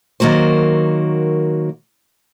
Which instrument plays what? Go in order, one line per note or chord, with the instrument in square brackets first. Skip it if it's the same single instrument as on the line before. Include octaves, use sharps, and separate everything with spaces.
[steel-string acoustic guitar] D#3 F#3 A#3 F#4 C5